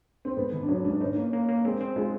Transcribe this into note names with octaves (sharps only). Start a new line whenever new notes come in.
C4
G#2 B3
D#3
D4
F#3 C#4
G#2 D4
C#4 D#4
A#3
A#3
A#3
G#3 C4
C4
G#3 F4